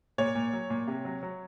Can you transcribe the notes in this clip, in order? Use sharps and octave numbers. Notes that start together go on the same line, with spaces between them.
A#2 C#5
A#2
F#3
A#2
C3
F#3
F#3